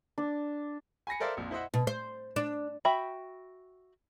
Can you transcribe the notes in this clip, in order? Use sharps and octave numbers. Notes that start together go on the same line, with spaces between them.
D4
G#5 B5 A#6 C#7
A4 A#4 C5 D5 E5 F5
A#1 F2 A#2
E4 C5 D#5 E5 F#5
B2
C5
D4
F#4 E5 G5 B5